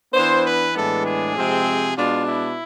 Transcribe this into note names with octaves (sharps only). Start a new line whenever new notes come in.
E3 B3 D4 C5
B4
A2 E3 G#3 B3 D4 A4
G#4
C3 F3 G#3 C4
B2 G#3 D4 F4
E4